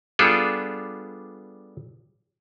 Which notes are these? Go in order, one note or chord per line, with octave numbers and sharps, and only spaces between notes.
G3 B3 D4 F4 G#4 A4